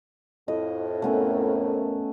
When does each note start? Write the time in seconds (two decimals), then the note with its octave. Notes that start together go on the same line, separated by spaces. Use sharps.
0.48 F2 A2 E4 D#5
1.02 A3 B3 C#4 A#4